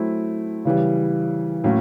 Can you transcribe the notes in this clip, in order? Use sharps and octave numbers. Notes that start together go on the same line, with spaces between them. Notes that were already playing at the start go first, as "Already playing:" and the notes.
Already playing: F#3 A3 C4 E4
C#3 E3 G3
A2 F#3 A#3 C#4